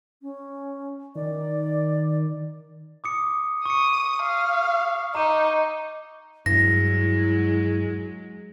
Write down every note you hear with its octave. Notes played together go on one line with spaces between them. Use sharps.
C#4
D#3 D5
D6 D#6 C#7
C#6 D#6 C#7
F5
D#4 A#5 D6 D#7
G2 F#3 G#3 E4 A#6